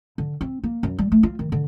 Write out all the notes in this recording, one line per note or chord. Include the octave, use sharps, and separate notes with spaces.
D3
C4
A#3
F#2
G3
A3
F4
D#3
D3